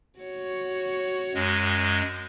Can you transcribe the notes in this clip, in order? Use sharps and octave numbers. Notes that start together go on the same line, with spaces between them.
F#4 C#5
F#2 G#3